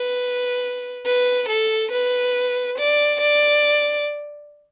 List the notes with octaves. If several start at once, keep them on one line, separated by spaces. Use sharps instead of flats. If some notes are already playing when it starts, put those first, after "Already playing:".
Already playing: B4
B4
A4
B4
D5
D5